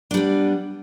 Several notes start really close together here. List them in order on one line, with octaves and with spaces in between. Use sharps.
D4 G3 B3